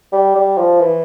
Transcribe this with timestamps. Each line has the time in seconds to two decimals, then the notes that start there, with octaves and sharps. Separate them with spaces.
0.12 G3
0.35 G3
0.57 F3
0.80 E3